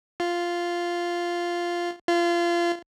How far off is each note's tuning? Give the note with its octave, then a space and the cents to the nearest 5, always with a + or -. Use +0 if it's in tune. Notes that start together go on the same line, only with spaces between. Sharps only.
F4 -5
F4 -25